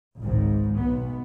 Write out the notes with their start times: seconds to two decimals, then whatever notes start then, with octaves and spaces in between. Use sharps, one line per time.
0.17 G#1 C#2 G#2
0.76 B1 B3